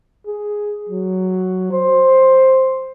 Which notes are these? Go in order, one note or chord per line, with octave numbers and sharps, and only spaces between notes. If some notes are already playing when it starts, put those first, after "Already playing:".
G#4
F#3
C5